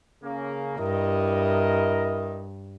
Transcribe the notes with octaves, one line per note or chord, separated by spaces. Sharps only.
C#3 A#3
G2 E4 A#4 D#5